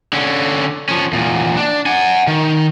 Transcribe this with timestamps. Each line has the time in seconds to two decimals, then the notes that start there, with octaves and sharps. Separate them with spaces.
0.13 D3 C#4
0.89 F3 C#4
1.13 E2 A#2
1.57 D4
1.86 F#5 G#5
2.27 D#3